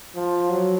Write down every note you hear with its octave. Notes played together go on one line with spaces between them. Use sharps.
F3
F#3